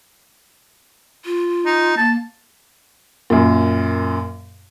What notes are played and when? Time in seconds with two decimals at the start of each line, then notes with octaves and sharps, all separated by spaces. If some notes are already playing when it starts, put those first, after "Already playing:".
1.25 F4
1.65 D#4
1.97 A#3 A5
3.30 F#2 A#2